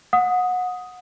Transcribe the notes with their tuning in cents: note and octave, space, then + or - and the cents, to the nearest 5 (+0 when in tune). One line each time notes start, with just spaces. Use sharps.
F#5 -25 D#6 +5